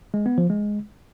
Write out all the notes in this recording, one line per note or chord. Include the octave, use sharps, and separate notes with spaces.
G#3
B3
F3
G#3